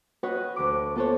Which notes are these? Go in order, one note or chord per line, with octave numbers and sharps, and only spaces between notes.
F#4 B4 C#5 D#5 F#5
D2 D3 D6
B3 F4 A4 C5 C#5